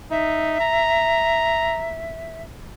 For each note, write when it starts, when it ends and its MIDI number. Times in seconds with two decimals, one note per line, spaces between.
0.11 0.58 63
0.11 2.43 76
0.60 1.94 82